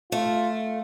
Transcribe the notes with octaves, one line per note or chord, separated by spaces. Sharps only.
A3 F4